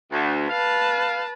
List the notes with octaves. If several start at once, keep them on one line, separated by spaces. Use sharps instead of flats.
D2
B4 F5 A5